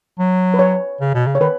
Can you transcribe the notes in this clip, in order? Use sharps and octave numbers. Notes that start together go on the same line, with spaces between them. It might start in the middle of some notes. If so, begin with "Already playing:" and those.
F#3
B4
C#5
C#3
B2
C#3
C#5
D#3 B4